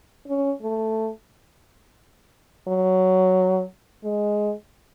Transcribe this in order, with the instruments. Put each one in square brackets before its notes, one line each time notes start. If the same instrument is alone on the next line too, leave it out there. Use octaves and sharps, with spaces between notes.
[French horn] C#4
A3
F#3
G#3